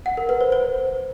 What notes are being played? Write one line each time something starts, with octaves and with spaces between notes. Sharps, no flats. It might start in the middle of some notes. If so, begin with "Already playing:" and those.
F#5
A#4
B4
C5
C5